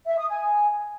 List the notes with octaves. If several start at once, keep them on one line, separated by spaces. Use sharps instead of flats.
E5
D#6
G#5